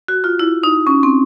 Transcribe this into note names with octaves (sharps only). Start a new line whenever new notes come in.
F#4
F4
E4
D#4
C#4
C4